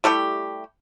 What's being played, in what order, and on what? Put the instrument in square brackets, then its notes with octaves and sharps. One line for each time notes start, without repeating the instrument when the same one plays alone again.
[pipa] G3 A3 E4 G4